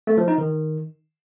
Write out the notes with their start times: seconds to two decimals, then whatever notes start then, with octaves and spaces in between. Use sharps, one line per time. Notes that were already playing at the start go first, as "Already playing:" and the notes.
0.07 A3
0.18 F3
0.28 D#4
0.38 D#3